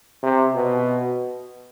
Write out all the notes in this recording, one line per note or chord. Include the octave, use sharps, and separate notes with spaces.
C3
B2